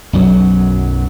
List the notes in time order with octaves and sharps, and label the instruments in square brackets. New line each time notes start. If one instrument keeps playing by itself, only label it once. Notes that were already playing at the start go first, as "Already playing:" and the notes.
[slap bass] B1 F#2 F#3